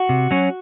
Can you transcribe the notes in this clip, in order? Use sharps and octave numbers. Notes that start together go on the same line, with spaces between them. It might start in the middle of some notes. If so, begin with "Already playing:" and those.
Already playing: F#4
C3
F#3 C#4